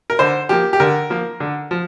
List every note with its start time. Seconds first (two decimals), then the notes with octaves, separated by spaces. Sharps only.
0.10 A#4
0.19 D3 C5
0.49 F3 A#3 G4
0.73 G4
0.80 D3 A#4
1.10 F3 A#3
1.40 D3
1.71 F3